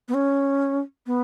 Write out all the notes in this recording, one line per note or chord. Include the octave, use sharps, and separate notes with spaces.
B3
C#4
B3